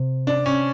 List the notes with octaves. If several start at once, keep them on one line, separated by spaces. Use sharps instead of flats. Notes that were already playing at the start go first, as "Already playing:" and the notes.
Already playing: C3
D4
C#4